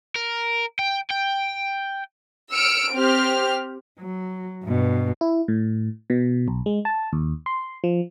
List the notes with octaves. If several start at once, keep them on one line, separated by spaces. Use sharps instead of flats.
A#4
G5
G5
E6 F6 C#7 D7
C4 G4 F6
F#3
G2 B2
E4
A2
B2
B1
G#3
A5
D#2
C6
F3